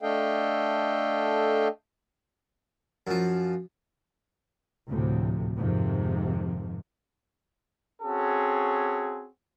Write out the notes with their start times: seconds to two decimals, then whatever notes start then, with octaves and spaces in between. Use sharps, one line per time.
0.02 A3 D4 A4 D#5 F5 G5
3.07 F#2 F3
4.88 D2 A2 C3 F3
5.58 F2 G#2 C3 D#3 F3
8.02 C4 C#4 F#4 G#4 A4